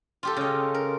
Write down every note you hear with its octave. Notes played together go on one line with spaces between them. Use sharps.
F4 G4 A4
C#3 D#5
A#4